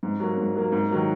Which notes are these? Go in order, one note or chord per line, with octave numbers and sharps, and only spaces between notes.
G#2
F#3 A#3
G#2
F#3 A#3
G#2
D#3 F#3 A#3